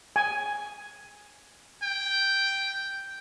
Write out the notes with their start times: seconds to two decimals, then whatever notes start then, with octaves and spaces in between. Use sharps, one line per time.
0.16 G#5
1.83 G5